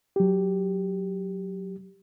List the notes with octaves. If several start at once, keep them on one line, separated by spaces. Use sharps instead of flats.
F#3 G4